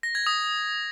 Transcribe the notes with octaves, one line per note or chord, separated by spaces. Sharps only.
A#6
G#6
D#6